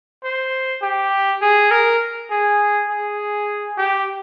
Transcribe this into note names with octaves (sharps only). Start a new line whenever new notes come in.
C5
G4
G#4
A#4
G#4
G#4
G4